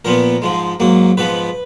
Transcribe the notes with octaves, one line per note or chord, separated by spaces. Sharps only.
A#2 F3 B3 A#4
G#2 F3 G#3
G#2 F#3 A#3
G#2 F3 B3 B4